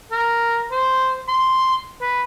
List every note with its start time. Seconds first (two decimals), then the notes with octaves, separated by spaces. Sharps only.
0.12 A#4
0.72 C5
1.28 C6
2.02 B4